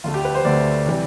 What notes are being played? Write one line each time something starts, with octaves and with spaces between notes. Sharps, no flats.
D2 D3 A3 F4
G4
B4
C5
D2 D3 A3 D5
C3 E3 G3